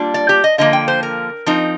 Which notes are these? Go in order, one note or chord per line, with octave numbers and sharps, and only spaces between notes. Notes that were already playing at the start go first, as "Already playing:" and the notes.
Already playing: G3 A#3 D4 F4
D5
G4
D#5
D3 F3 A#3 D#5
G5
C5
A#4
F3 C4 D#4